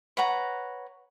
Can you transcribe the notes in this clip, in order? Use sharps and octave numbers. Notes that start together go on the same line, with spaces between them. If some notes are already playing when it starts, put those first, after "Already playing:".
B4 C#5 F#5 A#5